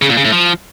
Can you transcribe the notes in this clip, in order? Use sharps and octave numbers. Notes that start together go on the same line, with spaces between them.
C#3
A#2
C#3
A2
F3